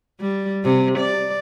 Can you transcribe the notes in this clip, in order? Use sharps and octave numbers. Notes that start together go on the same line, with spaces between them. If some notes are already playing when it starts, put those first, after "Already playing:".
G3
C3
D5